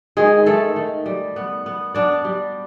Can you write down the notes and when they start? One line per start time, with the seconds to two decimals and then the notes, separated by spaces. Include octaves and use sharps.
0.17 D#3 G#3 G#4
0.46 D#3 A3 A4
0.76 D#3
1.06 G3
1.36 B3
1.66 B3
1.94 B3 D4 D5
2.25 G3